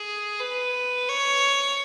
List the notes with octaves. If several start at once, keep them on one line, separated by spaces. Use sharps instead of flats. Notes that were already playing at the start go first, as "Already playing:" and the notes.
Already playing: G#4
B4
C#5